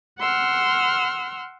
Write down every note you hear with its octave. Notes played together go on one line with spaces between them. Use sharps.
F#5 C6 E6 F6